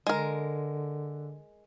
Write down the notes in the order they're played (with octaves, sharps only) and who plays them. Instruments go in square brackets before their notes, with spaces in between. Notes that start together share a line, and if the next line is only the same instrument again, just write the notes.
[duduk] D3 [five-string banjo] G#3 A#4